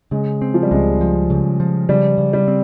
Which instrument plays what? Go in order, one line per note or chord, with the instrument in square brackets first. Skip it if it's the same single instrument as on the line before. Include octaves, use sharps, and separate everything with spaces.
[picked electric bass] C#3 [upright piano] G#3
[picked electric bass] C4
[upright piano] F3
G3
[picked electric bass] C#2 [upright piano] G#3
[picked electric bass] F3
C#3
F3
[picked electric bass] C#3 [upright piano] G3
[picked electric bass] C#3
[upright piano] G3
[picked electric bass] C4